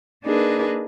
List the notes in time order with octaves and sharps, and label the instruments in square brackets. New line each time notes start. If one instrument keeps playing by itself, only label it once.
[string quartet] A#3 D4 D#4 G#4 A#4 B4